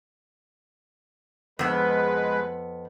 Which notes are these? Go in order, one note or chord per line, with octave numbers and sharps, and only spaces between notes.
F2 G#3 B3 B4